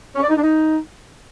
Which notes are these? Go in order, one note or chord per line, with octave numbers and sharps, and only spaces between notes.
C#4
D5
D#4
D4
D#4